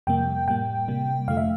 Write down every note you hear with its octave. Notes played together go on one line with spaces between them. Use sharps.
F2 C3 G3 A#3 G5
A2 G3 A#3 G5
C3 G3 A#3
F2 D3 F3 A3 F5
E5